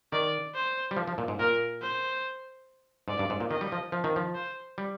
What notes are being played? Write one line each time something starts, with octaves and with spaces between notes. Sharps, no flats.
D#3 D5
C5
G3
F3
F3
A#2
G#2
A#2 A#4
C5
G#2 D5
G2
G#2
A#2
D#3 D#5
G3
F3
F3
D#3
F3
C5
G3